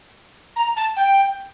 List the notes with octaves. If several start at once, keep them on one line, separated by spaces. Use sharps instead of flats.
A#5
A5
G5